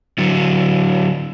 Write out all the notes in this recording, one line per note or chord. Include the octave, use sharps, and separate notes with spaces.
D3 F#3